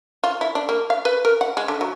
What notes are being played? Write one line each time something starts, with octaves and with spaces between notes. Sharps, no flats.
F4
E4
D4
A#3
F5
B4
A#4
F#5
G#3
D3
F#3